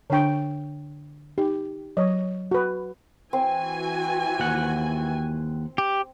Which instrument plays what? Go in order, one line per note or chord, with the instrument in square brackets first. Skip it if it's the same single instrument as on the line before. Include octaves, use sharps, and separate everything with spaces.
[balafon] D3 D4 C#6 [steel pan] C#5 G5
[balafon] D#4 [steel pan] G4
[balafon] F#3 [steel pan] C#5 D#5
[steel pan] F#4 B4
[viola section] E3 F#4 G#5 [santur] C4
[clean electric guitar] D#2 F#5
[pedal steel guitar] G4